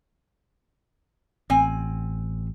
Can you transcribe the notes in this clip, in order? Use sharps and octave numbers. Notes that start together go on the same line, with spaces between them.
A1 C4 G#5